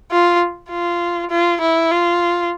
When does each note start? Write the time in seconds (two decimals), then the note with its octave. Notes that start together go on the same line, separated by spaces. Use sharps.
0.11 F4
0.70 F4
1.31 F4
1.61 E4
1.91 F4